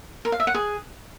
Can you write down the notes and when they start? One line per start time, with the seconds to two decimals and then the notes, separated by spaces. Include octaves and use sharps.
0.25 A#4
0.32 F5
0.40 E5
0.47 F#5
0.54 G#4